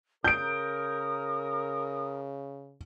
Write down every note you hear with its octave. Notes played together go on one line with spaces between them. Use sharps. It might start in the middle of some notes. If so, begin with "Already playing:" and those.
C#3 A#4 D#6 G6 D7